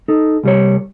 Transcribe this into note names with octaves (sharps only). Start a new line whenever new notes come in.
D#4 A4
C2 G3 C#5